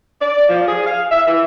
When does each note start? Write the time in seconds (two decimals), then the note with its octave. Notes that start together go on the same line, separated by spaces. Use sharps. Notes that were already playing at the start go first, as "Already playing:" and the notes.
0.21 D5
0.49 F3
0.68 G#4
0.86 F5
1.12 E5
1.28 E3